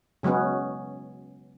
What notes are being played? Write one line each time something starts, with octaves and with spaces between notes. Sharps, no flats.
C#3 F#3 G#3 B3 C#4